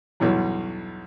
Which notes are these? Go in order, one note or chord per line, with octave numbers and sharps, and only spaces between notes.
B1 E2 G2 B2 E3 F#3